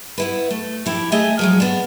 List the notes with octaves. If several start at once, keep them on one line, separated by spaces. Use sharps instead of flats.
B3 E4 B4
A3
F3 E4 G4
A3 G#4 D#5 E5
F3 F#3 G#3
B3 D4